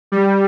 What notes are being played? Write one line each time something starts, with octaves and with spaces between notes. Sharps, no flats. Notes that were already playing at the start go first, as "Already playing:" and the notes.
G3